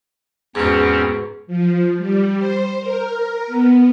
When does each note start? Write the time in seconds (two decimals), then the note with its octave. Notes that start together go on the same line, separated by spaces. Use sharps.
0.55 E2 G#2 B2 C4 C#4
1.47 F3
1.97 G3
2.36 C5
2.79 A#4
3.47 B3